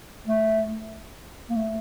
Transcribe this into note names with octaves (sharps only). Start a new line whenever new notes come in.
A3
A#3
A3